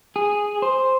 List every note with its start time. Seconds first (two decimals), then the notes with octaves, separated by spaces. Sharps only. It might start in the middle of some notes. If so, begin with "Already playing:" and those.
0.16 G#4
0.62 C5